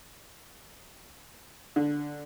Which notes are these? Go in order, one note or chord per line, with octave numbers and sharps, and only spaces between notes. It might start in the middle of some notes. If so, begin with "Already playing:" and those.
D3